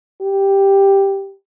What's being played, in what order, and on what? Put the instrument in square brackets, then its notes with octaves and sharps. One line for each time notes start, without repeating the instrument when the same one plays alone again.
[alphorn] G4